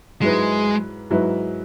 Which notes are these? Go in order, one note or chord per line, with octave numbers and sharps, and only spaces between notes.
G#2 F#3 G#3 E4 B4
G#2 F#3 E4 B4